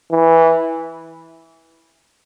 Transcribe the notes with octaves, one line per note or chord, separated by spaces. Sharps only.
E3